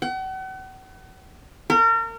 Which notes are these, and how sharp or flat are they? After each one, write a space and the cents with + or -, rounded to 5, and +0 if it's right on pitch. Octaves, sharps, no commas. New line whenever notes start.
F#5 +40
A#4 -35